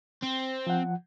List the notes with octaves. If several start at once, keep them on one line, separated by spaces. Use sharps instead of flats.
C4
F3 F#5